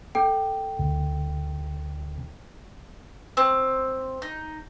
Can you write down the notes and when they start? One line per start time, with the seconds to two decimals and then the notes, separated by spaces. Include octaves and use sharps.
0.15 A4 G5
0.79 D2
3.37 C4
4.22 D#4